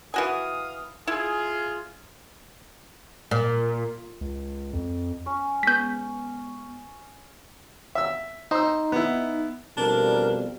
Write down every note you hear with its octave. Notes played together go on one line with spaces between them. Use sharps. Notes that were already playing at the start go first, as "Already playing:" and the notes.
E3 F#4 F5 G#5 D#6
E4 F4 G#4
A#2
C#2
F2
C#4
G#3 B3 G6 B6
E5 E6
D#4 C5 E6
B3 E4
F2 B2 G3 D4 A#4